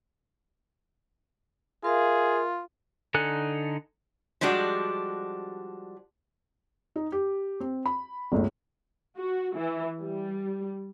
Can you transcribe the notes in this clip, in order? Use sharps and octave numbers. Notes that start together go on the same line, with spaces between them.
F4 G#4 A#4 E5 F5
D3 D#4 A4 G#5 F#6
F3 G3 G#3 D4 F4 F#4
D#4
G4
C4
B5
G1 C#2 A2
F#4
E3
G3